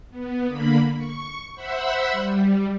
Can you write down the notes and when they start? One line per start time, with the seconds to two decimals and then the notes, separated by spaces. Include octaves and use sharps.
0.10 B3
0.46 D3 A#3 B5
0.95 C#6
1.55 C5 E5 F#5 B5 E6
2.12 G3